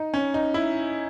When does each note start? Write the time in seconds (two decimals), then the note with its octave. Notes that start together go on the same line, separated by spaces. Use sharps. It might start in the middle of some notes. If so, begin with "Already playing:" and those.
Already playing: D#4
0.14 C#4
0.34 D#4
0.54 E4